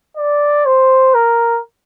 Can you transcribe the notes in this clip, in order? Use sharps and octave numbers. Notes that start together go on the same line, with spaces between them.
D5
C5
A#4